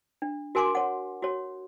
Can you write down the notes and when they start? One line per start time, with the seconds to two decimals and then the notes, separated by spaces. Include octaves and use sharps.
0.22 D4
0.55 F#4 A#4 G#5 C6 D6
0.75 C#5 F#5
1.22 F#4 C#5